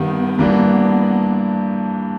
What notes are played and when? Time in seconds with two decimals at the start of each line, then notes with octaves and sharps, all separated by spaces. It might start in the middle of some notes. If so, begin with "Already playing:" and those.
Already playing: G2 D#3 G3 B3
0.39 G2 E3 G3 A#3 B3 D4